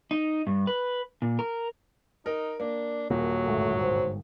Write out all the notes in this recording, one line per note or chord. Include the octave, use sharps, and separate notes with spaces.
D#4
G2
B4
A#2
A#4
D#4 A#4
A#3 D4
D#1 F#3 A#3
G1 G#2 A3
C5